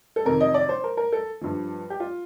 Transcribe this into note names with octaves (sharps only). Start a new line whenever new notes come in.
A4
F2 C3 D#3 A#4
D#5
D5
C5
A#4
A#4
A4
G2 F3
G4
F4